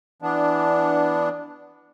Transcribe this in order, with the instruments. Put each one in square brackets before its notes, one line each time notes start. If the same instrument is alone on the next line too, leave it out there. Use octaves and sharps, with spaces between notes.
[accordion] E3 B3 D4